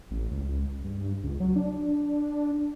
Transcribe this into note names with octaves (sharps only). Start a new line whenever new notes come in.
A1
C#2
G2
C#2
F#3
D4